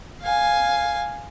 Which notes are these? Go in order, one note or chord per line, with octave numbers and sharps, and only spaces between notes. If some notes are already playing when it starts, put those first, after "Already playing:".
F5 G#5